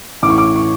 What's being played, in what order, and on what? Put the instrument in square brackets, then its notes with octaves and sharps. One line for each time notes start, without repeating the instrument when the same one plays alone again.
[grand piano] A1 A2 E3 D6
C#6
D6
C#6